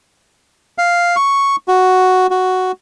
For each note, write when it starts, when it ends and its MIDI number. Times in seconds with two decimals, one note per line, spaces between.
0.78 1.16 77
1.16 1.56 85
1.68 2.27 66
2.31 2.72 66